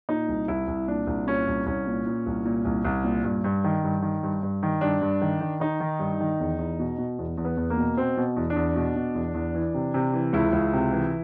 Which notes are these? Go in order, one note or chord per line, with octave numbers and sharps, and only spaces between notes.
A#2 D#4
C2
C2 E4
C2
A#2 D4
C2
A#2 C#4
C2
C2 C#4
A#2
A#2
C2
A#2
C2
C2
A#2
G2
G2
D#3
G2
D#3
G2
G2
D#3
G2 D4
G2
D#3
D#3
D#3 D#4
D#3
G2
D#3
E2
E2
B2
B2
E2
E2
B3
E2
A#3
B2
B2 C4
B2
E2
D4
E2
B2
B2
E2
E2
E3
C3
C3
E3
C#2 E4
C#2
C3
E3